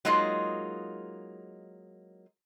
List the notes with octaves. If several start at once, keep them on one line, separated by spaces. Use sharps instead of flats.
F#3 G#3 A#3 D#4 F4 G#4